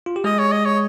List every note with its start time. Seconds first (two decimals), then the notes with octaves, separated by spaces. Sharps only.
0.06 F4
0.16 G4
0.24 G#3 G#4 D#5
0.39 C#5
0.51 D#5
0.65 C#5